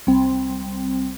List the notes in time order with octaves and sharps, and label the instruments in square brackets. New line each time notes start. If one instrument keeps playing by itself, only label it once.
[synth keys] C2 C4